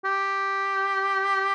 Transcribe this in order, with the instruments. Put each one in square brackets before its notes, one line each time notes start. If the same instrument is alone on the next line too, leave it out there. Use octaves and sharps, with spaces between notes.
[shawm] G4